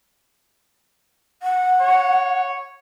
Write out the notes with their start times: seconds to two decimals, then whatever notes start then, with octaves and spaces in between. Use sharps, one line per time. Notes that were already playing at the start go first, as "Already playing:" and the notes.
1.43 F#5
1.80 C#5